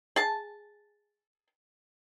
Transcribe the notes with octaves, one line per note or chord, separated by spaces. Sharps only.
G#4 A5